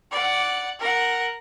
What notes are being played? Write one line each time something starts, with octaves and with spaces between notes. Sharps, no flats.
D5 F#5
A#4 F#5